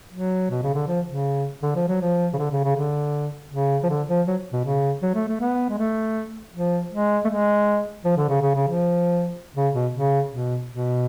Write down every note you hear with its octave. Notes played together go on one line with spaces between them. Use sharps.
F#3
B2
C#3
D3
F3
C#3
D3
F3
F#3
F3
C#3
D3
C#3
C#3
D3
C#3
F3
D3
F3
F#3
B2
C#3
F#3
A3
A3
B3
G#3
A3
F3
G#3
A3
G#3
F3
D3
C#3
C#3
C#3
F3
C#3
B2
C#3
B2
B2